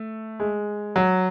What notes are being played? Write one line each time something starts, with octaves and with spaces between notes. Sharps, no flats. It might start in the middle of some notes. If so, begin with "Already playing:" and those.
Already playing: A3
G#3
F#3